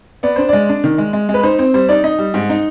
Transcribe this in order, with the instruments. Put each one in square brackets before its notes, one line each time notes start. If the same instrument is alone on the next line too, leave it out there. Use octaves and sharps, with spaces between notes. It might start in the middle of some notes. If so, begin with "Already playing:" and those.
[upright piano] B3 D5
D4 C5
G#3 D5
D4
D#3
G#3
G#3
G#3
B4
D#4 C5
C4 C5
G3 C5
D#4 D5
D#4 D#5
G3
G#2
D#4